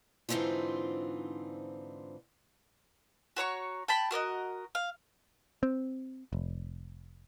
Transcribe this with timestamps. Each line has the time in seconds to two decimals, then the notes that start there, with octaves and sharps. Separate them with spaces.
0.29 G#2 D3 E3 C4 D#4 F4
3.36 F#4 C#5 A#5 C#6
3.88 G5 A5 B5
4.11 F#4 A#4 D5 D#5
4.75 F5
5.63 C4
6.33 F1